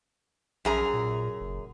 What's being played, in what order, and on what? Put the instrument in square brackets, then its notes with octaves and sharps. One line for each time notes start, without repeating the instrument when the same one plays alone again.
[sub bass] A#1 [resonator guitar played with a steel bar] F#2 G#4 A#5
[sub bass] A#2
F#1